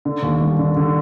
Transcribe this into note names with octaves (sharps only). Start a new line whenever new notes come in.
D3
D#2
G3
D3
D3